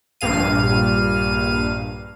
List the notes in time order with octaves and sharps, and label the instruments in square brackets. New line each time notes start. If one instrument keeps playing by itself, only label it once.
[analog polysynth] A#1 G2 F5 D#7